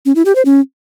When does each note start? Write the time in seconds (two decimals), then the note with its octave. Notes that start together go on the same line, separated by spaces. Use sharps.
0.06 C#4
0.15 E4
0.25 G4
0.35 C5
0.45 C#4